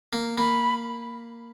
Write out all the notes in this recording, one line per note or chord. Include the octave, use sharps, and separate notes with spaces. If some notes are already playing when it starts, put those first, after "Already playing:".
A#3
A#3 B5